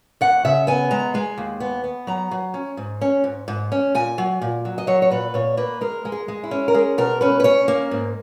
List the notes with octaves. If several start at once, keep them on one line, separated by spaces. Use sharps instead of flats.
D#2 F#5
C#3 E5
B3 G#5
G#3 A#5
G#3 G#5
D#2
B3
B3
F#3 A#5
F#3
C#4
G#2
C#4
G#2
G#2
C#4
A#2 G#5
F#3
A#2
F#3
D#5
F#3 C#5
C#5
A#2 B4
A#2 C#5
A#3 B4
G#3 A#4
G#3
G#4
G#3
E4
C#4
A#4
G#3 G#4
B2 A#4
C#4 B4
B4
C#4 C#5
A#3
G#2